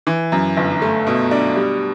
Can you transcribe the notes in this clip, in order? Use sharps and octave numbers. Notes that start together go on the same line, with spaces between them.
E3
F#2
G1
A3
B2
D4
G3